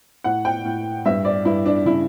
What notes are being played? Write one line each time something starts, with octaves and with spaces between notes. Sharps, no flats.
A2 F#5
G5
A2
G2 E5
D5
G2 E4
D4
C#3 E4